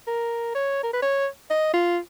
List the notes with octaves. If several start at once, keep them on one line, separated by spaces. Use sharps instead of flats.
A#4
C#5
A#4
B4
C#5
D#5
F4